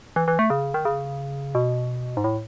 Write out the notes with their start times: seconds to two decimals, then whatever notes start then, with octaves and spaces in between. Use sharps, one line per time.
0.16 E3
0.28 E3
0.39 A3
0.50 C#3
0.74 D#3
0.85 C#3
1.55 B2
2.17 G#2
2.24 A2